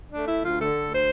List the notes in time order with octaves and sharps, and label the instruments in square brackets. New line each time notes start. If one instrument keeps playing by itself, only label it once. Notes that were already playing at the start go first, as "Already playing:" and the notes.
[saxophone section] D4
A3
E4
D2
F4
D3 A4
D2
C5